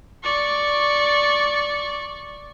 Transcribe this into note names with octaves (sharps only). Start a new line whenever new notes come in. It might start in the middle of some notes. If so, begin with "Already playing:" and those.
D5 C#6